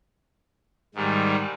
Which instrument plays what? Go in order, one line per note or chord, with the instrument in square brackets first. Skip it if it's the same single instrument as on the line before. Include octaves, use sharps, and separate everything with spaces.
[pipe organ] G#2 D#3 G3